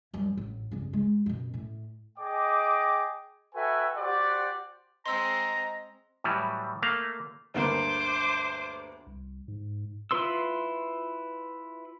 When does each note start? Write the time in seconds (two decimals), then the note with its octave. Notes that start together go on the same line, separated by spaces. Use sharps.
0.14 F#2 G3
0.37 A1
0.71 G1 C#3
0.93 G#3
1.26 F#2 B2
1.54 A2
2.18 G#4 D#5 G5 D6
3.54 F#4 A4 B4 E5 G5 G#5
3.96 F#4 G4 C5 D5 F#5
5.06 G#3 C4 D#5 A#5 C6 E6
6.24 A2 E3 F#3 G3
6.82 A3 A#3 F5
7.54 G1 D2 A#3 C5 D6
9.07 C2
9.48 G#2
10.11 E4 F4 B4 C6 E6